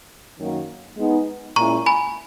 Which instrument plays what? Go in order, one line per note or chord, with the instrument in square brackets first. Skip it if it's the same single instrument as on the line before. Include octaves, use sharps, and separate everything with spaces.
[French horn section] F#2 D#3 F#3 A#3
G#3 B3 D#4
[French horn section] A#2 G#3 C#4 E4 [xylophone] A#5 C#6
[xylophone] G#5 B5